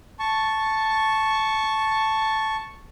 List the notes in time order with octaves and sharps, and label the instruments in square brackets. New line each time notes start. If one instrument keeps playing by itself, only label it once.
[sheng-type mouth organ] A5 C#6